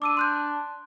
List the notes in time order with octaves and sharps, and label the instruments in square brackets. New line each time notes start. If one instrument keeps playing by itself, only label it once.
[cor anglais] D4 [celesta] D6 E6 D#7
[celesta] C6 F#6 G6